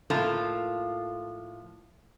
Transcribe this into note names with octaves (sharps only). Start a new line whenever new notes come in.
A2 F3 A#3 F4 A4